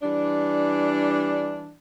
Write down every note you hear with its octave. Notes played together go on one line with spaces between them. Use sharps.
E3 G3 D4